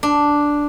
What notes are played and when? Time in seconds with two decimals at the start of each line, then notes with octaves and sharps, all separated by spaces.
0.03 D4